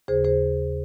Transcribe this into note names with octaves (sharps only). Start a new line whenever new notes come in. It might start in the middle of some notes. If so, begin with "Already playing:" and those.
D#2 C#3 G#4 C5
G#4 C5